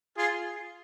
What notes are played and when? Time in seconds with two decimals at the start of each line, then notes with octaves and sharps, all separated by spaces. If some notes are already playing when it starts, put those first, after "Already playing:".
0.17 F4 G#4